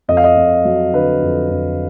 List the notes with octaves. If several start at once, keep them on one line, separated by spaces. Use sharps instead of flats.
F2 D#5
F5
D#5
F2
F#3
D3 B4
F2
F2